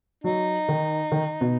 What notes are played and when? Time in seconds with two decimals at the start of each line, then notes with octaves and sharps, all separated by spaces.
0.24 F#3 D#4
0.68 D#3
1.12 D#3
1.41 B2